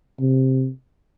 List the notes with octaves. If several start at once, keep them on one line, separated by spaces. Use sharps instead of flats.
C3